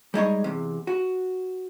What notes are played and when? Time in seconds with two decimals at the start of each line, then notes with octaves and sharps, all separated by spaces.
0.14 G3 G#3 D#4 C#5
0.44 E2 C3
0.87 F#4